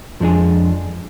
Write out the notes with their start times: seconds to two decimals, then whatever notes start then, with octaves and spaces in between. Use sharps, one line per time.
0.20 F2 F3 G#3 D4 G#4